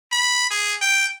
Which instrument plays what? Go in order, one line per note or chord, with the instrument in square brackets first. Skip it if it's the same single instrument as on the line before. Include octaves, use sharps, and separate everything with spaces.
[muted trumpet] B5
G#4
G5